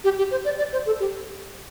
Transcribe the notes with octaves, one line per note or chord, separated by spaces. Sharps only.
G4
G4
C5
D5
D5
C5
A4
G4